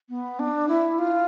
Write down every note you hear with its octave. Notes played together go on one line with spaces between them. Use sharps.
B3
D4
E4
F4